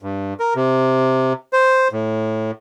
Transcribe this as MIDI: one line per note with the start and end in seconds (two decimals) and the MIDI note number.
0.02 0.34 43
0.40 0.54 70
0.55 1.33 48
1.53 1.88 72
1.93 2.51 45